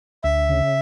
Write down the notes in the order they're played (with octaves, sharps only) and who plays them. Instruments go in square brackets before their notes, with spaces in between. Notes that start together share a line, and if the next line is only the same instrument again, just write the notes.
[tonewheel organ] D2 [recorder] E5
[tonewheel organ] C#3